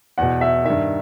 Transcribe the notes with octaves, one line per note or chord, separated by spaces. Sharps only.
E2 B2 F#5
E5
G2 D#3 E5